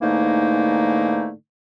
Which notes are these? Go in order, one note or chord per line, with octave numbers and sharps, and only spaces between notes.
G#2 D3 E3 A3 A#3 D#4